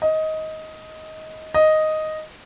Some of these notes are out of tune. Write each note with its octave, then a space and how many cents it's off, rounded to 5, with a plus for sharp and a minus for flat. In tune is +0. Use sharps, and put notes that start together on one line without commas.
D#5 +15
D#5 +0